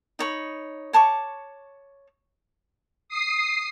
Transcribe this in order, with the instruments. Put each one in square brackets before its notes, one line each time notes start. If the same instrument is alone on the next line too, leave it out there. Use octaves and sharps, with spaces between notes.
[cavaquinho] D#4 C#5 B5
C#5 A5 C#6 D6
[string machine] D#6 C7